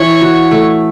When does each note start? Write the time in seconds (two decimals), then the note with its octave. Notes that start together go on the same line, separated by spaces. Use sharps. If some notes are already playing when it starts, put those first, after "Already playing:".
Already playing: E3 C#5
0.21 F#4
0.51 A3